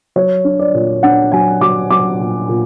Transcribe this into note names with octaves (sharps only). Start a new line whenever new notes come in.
F#3 C#5
D4
D5
A#2
D4 F#5
F#3 G#5
F#3 D6
F#3 D6
A#2
A#2